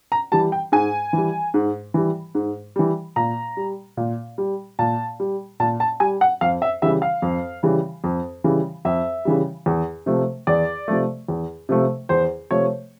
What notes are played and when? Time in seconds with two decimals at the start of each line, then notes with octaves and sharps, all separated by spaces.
0.12 A#5
0.32 E3 G3 A5
0.52 G5
0.72 G#2 G#5
1.13 E3 G3
1.54 G#2
1.94 E3 G3
2.35 G#2
2.76 E3 G3
3.16 A#2 A#5
3.57 G3
3.97 A#2
4.38 G3
4.79 A#2 A5
5.20 G3
5.60 A#2 A5
5.80 A5
6.00 G3 G#5
6.21 F#5
6.41 F2 F5
6.62 E5
6.82 C#3 E3 G3 E5
7.02 F5
7.22 F2
7.63 C#3 E3 G3
8.04 F2
8.44 C#3 E3 G3
8.85 F2 E5
9.25 C#3 E3 G3
9.66 E2
10.06 C3 F3 A3
10.47 E2 D5
10.88 C3 F3 A3
11.28 E2
11.69 C3 F3 A3
12.09 E2 C5
12.51 C3 F3 A3 C#5